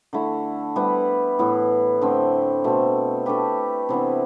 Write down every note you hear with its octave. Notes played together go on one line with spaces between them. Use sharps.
D3 A3 E4
G3 B3 E4 B4
A2 E3 B3 E4
D3 A3 C4
B2 A3 C4
A3 D4 G4 B4
C3 E3 B3 D4